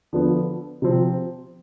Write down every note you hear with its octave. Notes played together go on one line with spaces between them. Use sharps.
D3 F3 B3
C3 F3 C4